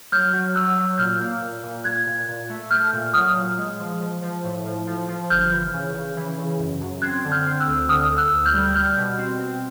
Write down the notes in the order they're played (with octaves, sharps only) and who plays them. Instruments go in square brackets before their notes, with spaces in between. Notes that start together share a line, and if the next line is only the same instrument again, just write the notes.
[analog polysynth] F#3 [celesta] F6 G6
[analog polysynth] F#3
[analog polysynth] F#3 [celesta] E6 F#6
[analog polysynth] F#3
[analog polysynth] A#2 [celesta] F6 G6
[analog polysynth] A#3
A#2
A#2
[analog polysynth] A#2 [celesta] F#6 G#6
[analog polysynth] A#2
A#2
A3
[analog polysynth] A3 [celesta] F6 G6
[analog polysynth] A#2
[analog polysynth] F#3 [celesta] D#6 F6
[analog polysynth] A#2
G#3
F3
F3
F3
A2
F3
F3
F3
[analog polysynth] G1 [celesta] F6 G6
[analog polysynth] E3
C#3
C#3
E3
C#3
F#2
F#2
[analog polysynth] C4 [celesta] F#6 G#6
[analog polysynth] D3
[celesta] F6 G6
[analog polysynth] C4
[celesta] E6 F#6
[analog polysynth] D2
[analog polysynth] D3 [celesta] D#6 F6
[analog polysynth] D3
[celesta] E6 F#6
[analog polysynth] D2
[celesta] F6 G6
[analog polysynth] G3
[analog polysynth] G3 [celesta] F6 G6
[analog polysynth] B2
C4
C4